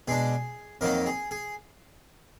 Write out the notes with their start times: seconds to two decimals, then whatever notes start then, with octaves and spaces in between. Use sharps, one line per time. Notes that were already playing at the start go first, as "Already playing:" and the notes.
0.08 B2 G#3 D4 G#4
0.81 F2 D#3 F#3 A#3 D#4 A#4
1.06 G#4
1.31 G#4